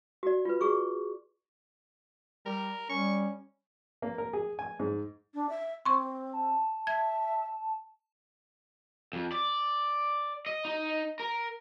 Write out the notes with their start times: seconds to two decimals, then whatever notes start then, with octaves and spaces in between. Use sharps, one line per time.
0.23 F#4 D5
0.45 F4 B4
0.61 F#4 G#4 C#6
2.46 G3 A#4
2.90 G3 C#4 C#6
4.02 A#3
4.18 A#4
4.33 G#4
4.59 G#5
4.80 G#2
5.34 D4
5.49 E5
5.86 C4 C6 C#6
6.33 A5
6.87 E5 G#6
9.13 F2
9.32 D5
10.46 D#5
10.65 D#4
11.20 A#4